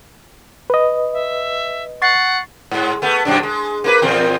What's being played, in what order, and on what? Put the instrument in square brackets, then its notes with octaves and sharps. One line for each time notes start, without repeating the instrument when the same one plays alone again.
[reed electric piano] B4 D#5
[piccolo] E5
[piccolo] F#5 [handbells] C#6 A6 C7
[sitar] G#2 G#3
A3 B3
F#2 B2 D4
G#3
A#3 D#4 B4
E2 A#2 C4